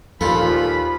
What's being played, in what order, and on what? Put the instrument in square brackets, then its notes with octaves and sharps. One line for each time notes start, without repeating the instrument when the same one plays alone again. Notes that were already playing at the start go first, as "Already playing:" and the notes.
[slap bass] D#2 [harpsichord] A#2 F4 A4 [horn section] F3 [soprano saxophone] B5